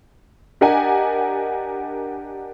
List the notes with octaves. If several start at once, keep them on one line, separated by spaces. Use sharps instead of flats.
D4 G4 A#4 D#5 F#5 G#5